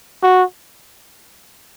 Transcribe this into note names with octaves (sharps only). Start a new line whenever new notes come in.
F#4